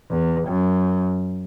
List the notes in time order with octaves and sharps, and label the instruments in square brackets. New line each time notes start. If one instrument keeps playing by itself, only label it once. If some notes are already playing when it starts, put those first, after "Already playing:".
[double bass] E2
F#2